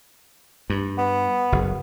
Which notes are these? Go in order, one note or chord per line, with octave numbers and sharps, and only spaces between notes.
G2
B3
F#1